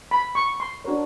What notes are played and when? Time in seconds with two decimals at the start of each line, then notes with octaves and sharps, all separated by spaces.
0.11 B5
0.35 C#6
0.60 C6
0.84 D4 F#4 A#4 C#5